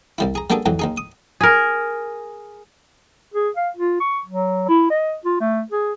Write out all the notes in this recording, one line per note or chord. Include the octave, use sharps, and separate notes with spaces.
C2 G3 E4
G#4 A#5
G3 A#3 B3 D4 G#4 A4
F2 G#2 E3 F#3
D#2 D#4 G#4
D#6
G#4 A#4
G#4
F5
F4
C#6
F#3
E4
D#5
F4
A3
G#4